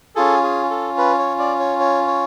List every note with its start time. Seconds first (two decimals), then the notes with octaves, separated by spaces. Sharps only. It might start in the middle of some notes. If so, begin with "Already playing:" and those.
0.16 C#4 F4 G#4 A4
0.43 G#4
0.70 A4
0.98 B4
1.19 C#5
1.39 D5
1.60 C#5
1.80 C#5
2.07 C#5